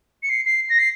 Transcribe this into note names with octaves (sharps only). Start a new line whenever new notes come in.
C#7
C7
C7
A#6
C7